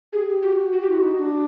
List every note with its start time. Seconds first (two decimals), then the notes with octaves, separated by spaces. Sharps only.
0.13 G4 G#4
0.28 G4
0.42 F#4 G4
0.58 F#4
0.72 F#4
0.81 G4
0.88 E4 F#4
1.02 D#4
1.18 D4